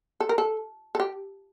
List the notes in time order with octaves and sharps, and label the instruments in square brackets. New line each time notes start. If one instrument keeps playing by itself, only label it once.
[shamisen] A4
A#4
A4
A4
G4